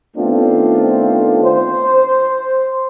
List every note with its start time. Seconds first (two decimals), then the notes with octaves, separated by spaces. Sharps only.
0.17 D#3 A3 B3 C4 D4 F4
1.44 C5